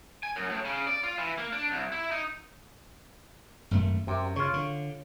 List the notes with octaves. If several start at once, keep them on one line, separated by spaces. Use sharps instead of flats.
G#5
F#2
A2
C#3
D5
F4
E3
A#3
D4
C2
E4
D#4
G#1 F#2 A3
F#2 C3
C#3 F4 C#5
D3